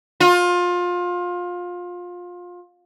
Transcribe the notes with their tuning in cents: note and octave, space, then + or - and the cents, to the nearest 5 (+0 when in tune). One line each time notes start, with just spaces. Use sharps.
F4 +25